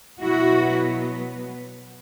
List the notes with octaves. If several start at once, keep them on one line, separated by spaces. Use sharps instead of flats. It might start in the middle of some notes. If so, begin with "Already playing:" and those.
B2 F#3 B3 E4 F#4